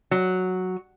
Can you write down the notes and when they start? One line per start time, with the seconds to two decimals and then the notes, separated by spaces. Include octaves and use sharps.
0.11 F#3